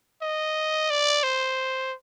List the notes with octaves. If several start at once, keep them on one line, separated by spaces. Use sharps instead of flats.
D#5
D5
C5